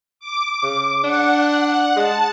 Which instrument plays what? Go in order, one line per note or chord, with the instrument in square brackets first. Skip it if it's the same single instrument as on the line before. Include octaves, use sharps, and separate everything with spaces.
[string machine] D6
[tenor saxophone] C#3
[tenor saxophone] D4 [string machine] F#5
[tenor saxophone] G#3 [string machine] A5